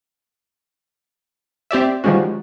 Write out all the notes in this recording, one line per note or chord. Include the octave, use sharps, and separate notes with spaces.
C4 G4 D5 E5
D#3 F3 G3 G#3 C#4 F#4